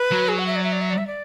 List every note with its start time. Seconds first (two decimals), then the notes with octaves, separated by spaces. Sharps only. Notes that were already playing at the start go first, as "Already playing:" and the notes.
Already playing: B4
0.11 F#3
0.28 G#4
0.38 F#5
0.47 E5
0.56 D5
0.64 E5
0.73 D5
0.81 E5
0.90 D5
0.98 E5
1.07 D5